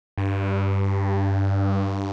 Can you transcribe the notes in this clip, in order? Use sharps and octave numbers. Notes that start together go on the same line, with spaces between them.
G2